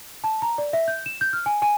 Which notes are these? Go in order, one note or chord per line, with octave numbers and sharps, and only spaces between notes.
A5
A#5
D5
E5
G6
E7
G6
F6
G#5
G#5